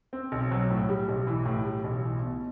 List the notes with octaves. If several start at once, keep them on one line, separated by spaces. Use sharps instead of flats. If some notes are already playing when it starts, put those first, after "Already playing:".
C4
B1
F#3
A2
G3
B1
E3
A2
G3
B1
E3
B2